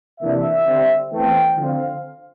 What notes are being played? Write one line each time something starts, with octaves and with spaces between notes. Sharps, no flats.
C3 E3 A#3 D4 E5
D3 G3 C4
E2 E3 A3 C4 G5
D3 F3 C4 F5